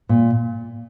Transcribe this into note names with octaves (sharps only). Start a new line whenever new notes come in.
A#2